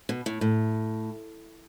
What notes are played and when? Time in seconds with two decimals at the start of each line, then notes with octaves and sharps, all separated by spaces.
0.09 B2
0.26 A2
0.41 A2